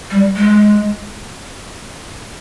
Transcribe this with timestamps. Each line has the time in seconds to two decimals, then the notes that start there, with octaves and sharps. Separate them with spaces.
0.11 G3
0.36 G#3